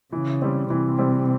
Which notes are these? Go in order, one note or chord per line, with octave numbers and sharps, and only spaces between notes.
C#3 E3
G3 C4
C3 E3
G3 C4